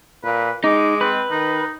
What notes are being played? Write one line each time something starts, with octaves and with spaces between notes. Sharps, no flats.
A#2 B4
G#3 D#4 D6
C4 B4
D#3 D#4